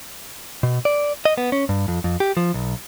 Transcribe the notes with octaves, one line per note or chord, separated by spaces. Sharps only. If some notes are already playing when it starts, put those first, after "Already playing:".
B2
D5
D#5
B3
C#4
G2
F2
F2
G4
F3
B1